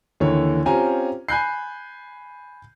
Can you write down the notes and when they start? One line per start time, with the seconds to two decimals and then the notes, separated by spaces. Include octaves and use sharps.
0.20 D#2 D3 E3 C#5
0.66 C4 C#4 F4 G4 G#5 A#5
1.29 G#5 B5 F#6 G6 C7